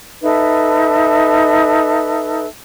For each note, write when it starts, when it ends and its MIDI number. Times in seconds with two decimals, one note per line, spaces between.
0.24 2.46 63
0.24 2.46 69
0.24 2.46 71
0.24 2.46 76